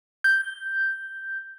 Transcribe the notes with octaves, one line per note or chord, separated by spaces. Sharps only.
G6